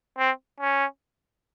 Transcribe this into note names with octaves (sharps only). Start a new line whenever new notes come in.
C4
C#4